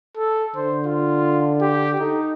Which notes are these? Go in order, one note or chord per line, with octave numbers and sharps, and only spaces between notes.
A4
D3 C5
F4
G4
D#4 A4